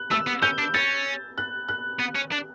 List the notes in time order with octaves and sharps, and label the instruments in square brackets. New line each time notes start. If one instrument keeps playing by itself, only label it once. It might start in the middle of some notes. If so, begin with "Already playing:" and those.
Already playing: [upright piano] F#6
[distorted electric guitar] A3 [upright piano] E6
[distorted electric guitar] B3
[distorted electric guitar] C#4 [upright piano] G6
[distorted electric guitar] D4
[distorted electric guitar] C#4 [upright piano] A6
[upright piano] F#6
F#6
[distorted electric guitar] B3
C#4
D4